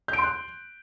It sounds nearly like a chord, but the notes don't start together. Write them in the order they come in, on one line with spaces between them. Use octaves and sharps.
G6 D7 C6 F#6